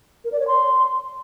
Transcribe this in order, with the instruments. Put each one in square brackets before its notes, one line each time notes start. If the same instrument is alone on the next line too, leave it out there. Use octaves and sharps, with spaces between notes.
[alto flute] A#4
D5
C#5
C6